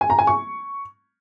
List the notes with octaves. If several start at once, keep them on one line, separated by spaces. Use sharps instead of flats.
G#5
A#5
G#5
C#6